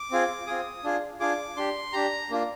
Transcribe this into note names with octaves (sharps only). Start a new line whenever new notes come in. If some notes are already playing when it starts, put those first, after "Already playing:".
Already playing: D6
C4 F4 G#4
C4 F4 G#4 D#6
D4 F4 G#4
D4 F4 G#4 D6
D4 G4 C6
D4 G4 A#5
A#3 D4 F4